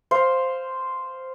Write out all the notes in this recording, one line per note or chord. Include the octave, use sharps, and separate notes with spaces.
C5 F5